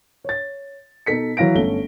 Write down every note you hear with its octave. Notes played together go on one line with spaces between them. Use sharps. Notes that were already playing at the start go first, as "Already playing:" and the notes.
C#5 A6
B2 D#4 A4 B6 C#7
E3 F#3 E4 F5 A#6 D7
G1 A3 C#4 G7